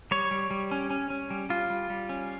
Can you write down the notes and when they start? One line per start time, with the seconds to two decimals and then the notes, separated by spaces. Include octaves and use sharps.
0.11 G3 C#5
0.31 G3
0.51 G3
0.71 C#4
0.90 C#4
1.10 C#4
1.31 G3
1.49 G3 F4
1.70 G3
1.90 G3
2.09 C#4